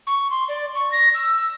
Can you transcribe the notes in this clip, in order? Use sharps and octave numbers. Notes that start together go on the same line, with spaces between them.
C#6
C6
D5
C#6
A#6
E6